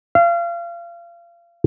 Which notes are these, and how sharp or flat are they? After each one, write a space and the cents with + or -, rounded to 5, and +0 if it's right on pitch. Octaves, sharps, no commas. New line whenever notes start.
F5 -30